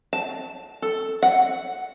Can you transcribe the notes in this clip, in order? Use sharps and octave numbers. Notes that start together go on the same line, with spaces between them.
A5
A4
F#5